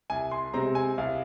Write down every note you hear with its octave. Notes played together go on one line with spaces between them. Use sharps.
C2 G#5
C6
C3 G#3 C4 A#5
G#5
C2 F5